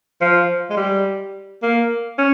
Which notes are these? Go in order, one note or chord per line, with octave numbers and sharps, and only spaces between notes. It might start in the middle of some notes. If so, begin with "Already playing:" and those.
F3
G#3
G3
A#3
C#4